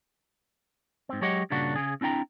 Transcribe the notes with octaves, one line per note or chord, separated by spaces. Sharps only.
G#2 C4
F#3 G#3 G4 C#5 D#5 F#5
G2 A#2 C#3 A#3 D4 F#4
C#3 G#4
C4 D4 E4 G5 A#5